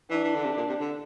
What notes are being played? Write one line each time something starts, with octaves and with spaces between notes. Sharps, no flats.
E3 D4
E3
D3
C3
A#2
C3
D3